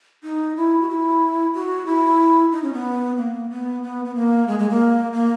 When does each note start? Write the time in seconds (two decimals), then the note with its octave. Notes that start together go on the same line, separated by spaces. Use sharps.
0.24 D#4
0.57 E4
0.81 F#4
0.89 E4
1.54 F#4
1.86 E4
2.52 D#4
2.63 C#4
2.73 B3
3.17 A#3
3.50 B3
3.83 B3
4.05 B3
4.16 A#3
4.48 G#3
4.59 G#3
4.70 A#3
5.13 A#3